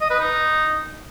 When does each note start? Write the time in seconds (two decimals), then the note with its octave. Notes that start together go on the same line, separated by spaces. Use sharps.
0.01 D#5
0.10 B4
0.19 D#4